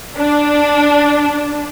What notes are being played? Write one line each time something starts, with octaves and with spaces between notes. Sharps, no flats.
D4